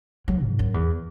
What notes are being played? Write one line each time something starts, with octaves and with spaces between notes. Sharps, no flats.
F#3
G#2
F#2
E2